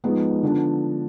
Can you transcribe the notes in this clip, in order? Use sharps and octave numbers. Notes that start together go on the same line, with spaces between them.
F3 G#3 B3 D#4
D3 F3 B3 D4